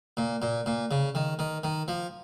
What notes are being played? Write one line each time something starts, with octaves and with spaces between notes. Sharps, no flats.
A#2
A#2
A#2
C#3
D#3
D#3
D#3
F3